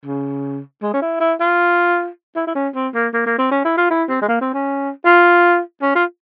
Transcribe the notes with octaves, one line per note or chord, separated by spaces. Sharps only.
C#3
G#3
C#4
E4
E4
F4
E4
E4
C#4
C4
A#3
A#3
A#3
C4
C#4
E4
F4
E4
C4
G#3
A#3
C4
C#4
F4
C#4
F4